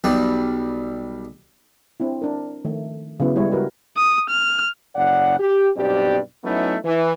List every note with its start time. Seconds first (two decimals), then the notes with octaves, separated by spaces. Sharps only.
0.04 B1 G3
2.00 C4 D4 E4
2.22 D4 A#4
2.65 D#3 F3 A3
3.20 C#3 F#3 B3 E4
3.36 G3 G#3 E4 C#5
3.52 C#3 F#4 G4 A#4 B4
3.97 D#6
4.30 F6
4.96 F#1 C#3 D5 F#5
5.39 G4
5.77 B1 G2 B2 C4 G4 D5
6.45 F#3 A3 B3 C#4 D#4 E4
6.85 E3